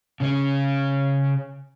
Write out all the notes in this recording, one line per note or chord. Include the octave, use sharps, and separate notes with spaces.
C#3 C#4